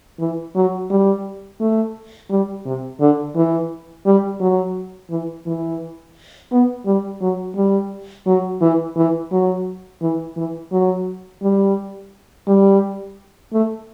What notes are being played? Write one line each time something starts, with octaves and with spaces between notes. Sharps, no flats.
E3
F#3
G3
A3
G3
C3
D3
E3
G3
F#3
E3
E3
B3
G3
F#3
G3
F#3
E3
E3
F#3
E3
E3
F#3
G3
G3
A3